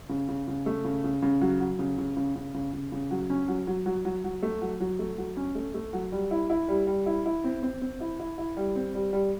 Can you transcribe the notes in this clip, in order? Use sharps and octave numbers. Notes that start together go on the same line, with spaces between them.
C#3
C#3
C#3
A3
C#3
C#3
C#3
F#3
F#3
C#3
C#3
C#3
C#3
C#3
C#3
C#3
F#3
C#4
F#3
F#3
F#3
F#3
F#3
A3
F#3
F#3
A3
F#3
C#4
A3
A3
F#3
G3
E4
E4
G3
G3
E4
E4
C4
C4
C4
E4
E4
E4
G3
C4
G3
G3